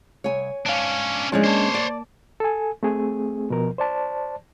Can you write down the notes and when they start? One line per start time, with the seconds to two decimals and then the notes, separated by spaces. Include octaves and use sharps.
0.24 C2 C#5 G#5
0.66 G#2 C#4 D4 F5
1.32 F3 G#3 C#4 D4 E4 G#4
1.44 A#3 C5 C#5 A5
1.74 D5
2.40 A4 G#5
2.83 A3 C4 G#4
3.50 B2 F3 A#4
3.78 C5 D5 A5